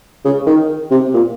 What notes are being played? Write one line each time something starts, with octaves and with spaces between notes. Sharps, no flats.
C#3
D#3
C3
A#2